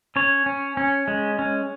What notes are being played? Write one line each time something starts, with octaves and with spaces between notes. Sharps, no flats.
C#4 C#5
C#4
C#4
G#3
C#4